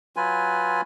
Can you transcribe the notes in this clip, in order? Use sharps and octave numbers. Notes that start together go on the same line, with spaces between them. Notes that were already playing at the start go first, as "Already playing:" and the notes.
F#3 F4 B4 G#5